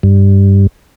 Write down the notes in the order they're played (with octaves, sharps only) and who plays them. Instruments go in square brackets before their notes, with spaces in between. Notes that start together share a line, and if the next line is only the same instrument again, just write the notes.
[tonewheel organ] G2